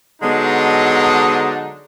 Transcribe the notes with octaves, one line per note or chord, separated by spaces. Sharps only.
D3 F#3 G#3 B3 D4 D#4